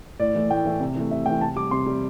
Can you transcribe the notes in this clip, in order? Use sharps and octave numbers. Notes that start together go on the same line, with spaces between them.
A2 D5
E3 A3
A2 G5
E3 A3
C3
E3 A3
C3 E5
E3 A3 G5
C3 A5
G3 D6
C3 C6
G3